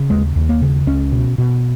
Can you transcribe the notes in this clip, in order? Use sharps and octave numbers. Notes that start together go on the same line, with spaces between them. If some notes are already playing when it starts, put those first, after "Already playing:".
Already playing: C#3
D#2 G#3
D#2
A#3
C#3
C#2 C#4
B2
B2